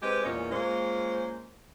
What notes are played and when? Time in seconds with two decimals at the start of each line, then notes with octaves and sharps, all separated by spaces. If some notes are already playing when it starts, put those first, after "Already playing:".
0.02 G#3 C4 G4 B4 D#5
0.24 E2 A#2 C#4 D#5
0.51 G#3 A#3 C#4 F4 C5